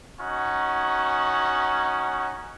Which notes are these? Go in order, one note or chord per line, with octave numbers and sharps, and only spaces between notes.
C#4 D#4 F#4